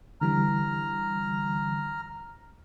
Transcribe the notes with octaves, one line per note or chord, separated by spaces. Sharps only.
D3 E3 G3 A#5 F6